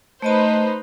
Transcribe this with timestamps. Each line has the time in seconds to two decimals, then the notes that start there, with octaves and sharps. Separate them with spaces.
0.22 A3 D#4 B4 C5 D#5 A5